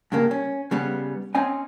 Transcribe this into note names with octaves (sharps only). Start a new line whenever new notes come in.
G2 C#3 A#3
C#4
C#3 G3 B3
C4 C#4 D#5 G#5